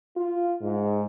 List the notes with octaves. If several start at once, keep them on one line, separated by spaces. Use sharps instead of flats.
F4
G#2